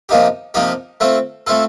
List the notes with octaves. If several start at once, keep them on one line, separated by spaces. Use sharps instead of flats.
C3 F3 A#3 D#4 G4
C3 F3 A#3 D#4 G4
A3 C4 F4 A4
A3 C4 F4 A4